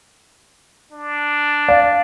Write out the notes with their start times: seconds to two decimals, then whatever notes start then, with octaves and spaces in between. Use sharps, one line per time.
0.92 D4
1.68 D5 F5